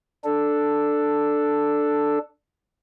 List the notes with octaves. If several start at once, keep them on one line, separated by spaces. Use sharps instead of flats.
D4 A4